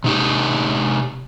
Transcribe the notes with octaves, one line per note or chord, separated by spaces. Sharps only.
C3 D#4 G4